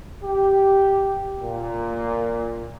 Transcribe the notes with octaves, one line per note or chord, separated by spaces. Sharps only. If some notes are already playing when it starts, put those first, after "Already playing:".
G4
A#2